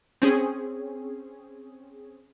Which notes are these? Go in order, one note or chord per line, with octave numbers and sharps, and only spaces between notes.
C4 C#4 G#4